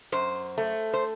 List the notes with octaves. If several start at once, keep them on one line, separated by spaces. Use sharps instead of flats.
F#2 C5
A3
C5